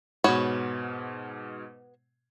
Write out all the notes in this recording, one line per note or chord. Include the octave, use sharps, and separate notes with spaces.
G#2 B2 B3 F#4 C#5